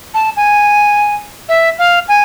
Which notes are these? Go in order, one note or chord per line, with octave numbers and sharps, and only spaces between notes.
A5
G#5
E5
F5
G#5